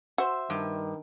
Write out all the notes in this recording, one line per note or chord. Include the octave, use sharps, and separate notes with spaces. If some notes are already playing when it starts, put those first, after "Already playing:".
F#4 C5 E5
G2 D#3